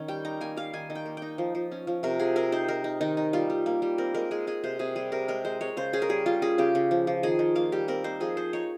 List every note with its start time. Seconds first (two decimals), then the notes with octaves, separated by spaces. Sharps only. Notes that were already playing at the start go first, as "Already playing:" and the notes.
Already playing: D#3 C#4
0.08 G3 G5
0.25 D#4 A#5
0.41 A#3 G#5
0.57 G3 F5
0.73 D#3 G#5
0.90 D#3
0.95 G5
1.06 A#3
1.17 D#4 G5
1.38 F3
1.55 F3
1.71 C#4
1.87 F3
2.03 C3 A#4
2.20 F3 G#4
2.36 C4 A#4
2.52 D#4 C5
2.68 D#4 A#4
2.84 D#4
3.01 D#3 D#4
3.17 D#4
3.33 G3 F4
3.50 G3
3.66 A#3
3.82 G3
3.98 C4 A#4
4.14 G#3 A#4
4.31 G#3 G#4
4.47 G#3 G#4
4.64 C3 C5
4.79 C3 G#4
4.96 G3 G#4
5.12 C3 A#4
5.28 G#3 A#4
5.45 G#3 C5
5.61 G#3 C#5
5.77 C#3 C5
5.93 C#4 G#4
6.02 A#4
6.09 G3 G#4
6.26 G3 F4
6.42 C#4 G#4
6.58 C#3 G4
6.75 C#3
6.91 F3
7.07 F3
7.23 D#3 G#4
7.39 D#3
7.55 A#3 F5
7.72 G3 G4
7.88 C4 A#4
8.04 D#4 C5
8.20 F3 G#4
8.37 D#4 C5
8.53 D#4 C#5